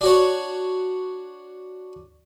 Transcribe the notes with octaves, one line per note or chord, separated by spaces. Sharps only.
D4 F#4 C#5